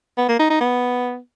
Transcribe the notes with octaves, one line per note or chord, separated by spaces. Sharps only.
B3
A#3
D#4
D#4
B3